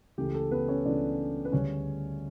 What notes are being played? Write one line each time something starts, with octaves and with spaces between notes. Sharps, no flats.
C#2 C#3 E3 A3 G4
A4
B3 B4
C#4 C#5
C#2 C#3 E3 A3 D4 D5
B4
D2 C#3 G3 C#4 C#5